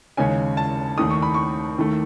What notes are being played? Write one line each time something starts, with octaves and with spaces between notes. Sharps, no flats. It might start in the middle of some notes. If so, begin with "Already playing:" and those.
D#2 C#3 G#3 C#4 G#5
A5
D#2 D#3 A3 D#6
C#6
B5
C#6
D#2 D#3 A3